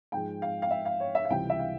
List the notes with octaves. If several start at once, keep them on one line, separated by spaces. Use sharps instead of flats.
G#2 F3 G#3 G5
F5
F5
E5
F5
C#5
E5
F5
C#2 C3 E3 G3 G5
E5
F5